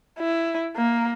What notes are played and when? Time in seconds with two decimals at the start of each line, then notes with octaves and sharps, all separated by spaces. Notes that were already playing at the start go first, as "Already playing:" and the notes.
0.19 E4
0.76 A#3